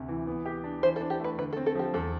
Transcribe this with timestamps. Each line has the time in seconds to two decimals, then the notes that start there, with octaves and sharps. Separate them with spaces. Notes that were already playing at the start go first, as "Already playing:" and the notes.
Already playing: D2 C3
0.08 E3
0.27 B3
0.46 G4
0.64 D4
0.83 E3 C5
0.96 A4
1.00 D4
1.10 G4
1.20 A3 B4
1.38 D3 B4
1.53 A4
1.57 C4
1.66 A4
1.75 F3 G4
1.94 E2 A4